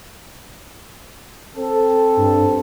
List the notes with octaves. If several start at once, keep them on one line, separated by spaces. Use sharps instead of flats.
C4 A4
G2